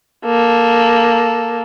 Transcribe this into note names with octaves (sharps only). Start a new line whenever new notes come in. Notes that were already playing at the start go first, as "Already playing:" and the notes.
A#3 A4